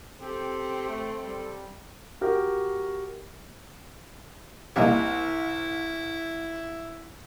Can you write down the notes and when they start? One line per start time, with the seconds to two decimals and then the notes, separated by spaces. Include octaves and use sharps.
0.21 C4 G4 A4
0.88 A3
1.22 G3
2.21 F#4 G4 A#4
4.76 C2 C3 A#3 D#4 E4